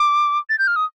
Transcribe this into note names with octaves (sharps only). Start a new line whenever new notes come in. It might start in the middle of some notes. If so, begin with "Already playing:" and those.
Already playing: D6
A6
G6
F6
D#6